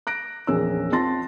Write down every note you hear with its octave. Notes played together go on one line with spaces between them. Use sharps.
F#6 A#6 D7
A#1 E2 C#4 G#4 A#4 E6
C4 F4 A5 C6 A6 A#6